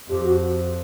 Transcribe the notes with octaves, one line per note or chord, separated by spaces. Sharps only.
F2 G4
F#4